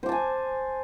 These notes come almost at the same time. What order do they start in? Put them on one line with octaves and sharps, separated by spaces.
C5 D6 A5 G#5